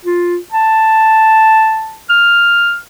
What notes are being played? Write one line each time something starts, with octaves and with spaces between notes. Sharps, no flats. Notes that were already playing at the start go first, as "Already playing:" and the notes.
F4
A5
F6